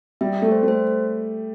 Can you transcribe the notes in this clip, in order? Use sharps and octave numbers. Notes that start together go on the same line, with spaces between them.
G3 E5
G4
A3
C5
A3
C5